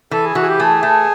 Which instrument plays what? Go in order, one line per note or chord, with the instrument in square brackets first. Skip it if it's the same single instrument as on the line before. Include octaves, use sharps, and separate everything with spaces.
[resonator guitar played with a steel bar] E3 [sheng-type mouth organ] A4
[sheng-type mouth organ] G#4
[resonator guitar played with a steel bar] E3 [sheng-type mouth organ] F#4
[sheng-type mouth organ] G#4
G4
[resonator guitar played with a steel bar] A3 [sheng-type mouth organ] G#4
[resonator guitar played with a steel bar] A3